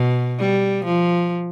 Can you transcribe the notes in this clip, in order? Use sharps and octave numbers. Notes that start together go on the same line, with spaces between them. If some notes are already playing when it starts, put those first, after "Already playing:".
Already playing: B2
G3
F3